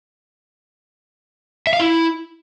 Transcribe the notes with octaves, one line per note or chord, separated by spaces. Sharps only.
E5
F5
E4